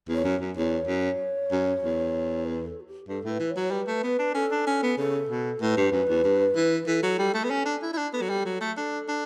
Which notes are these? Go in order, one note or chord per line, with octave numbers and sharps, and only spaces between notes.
E2
C#5
F#2
F#2
E2 C#5
F#2
F#2
E2
B4
A4
F#4
G4
G2 A4
A2 B4
E3
C#5
F#3
G3 B4
A3
B3
D4
C#4 A4
D4
C#4
B3
C#3 A4
B2
A2 B4
G2
F#2
E2
G2
E3
E3 A4
F#3
G3
A3
B3
C#4
D4
E4
E4
D4
B3 A4
F#3
G3
F#3
A3
D4 A4
D4